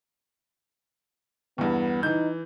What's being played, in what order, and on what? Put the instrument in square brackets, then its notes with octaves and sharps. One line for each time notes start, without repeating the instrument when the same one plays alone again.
[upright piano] E2 G2 [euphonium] B3
[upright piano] E3 G6 [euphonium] D#4